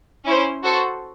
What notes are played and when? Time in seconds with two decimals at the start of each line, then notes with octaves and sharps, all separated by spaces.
0.25 C#4 E4 C5
0.63 F#4 A4 C5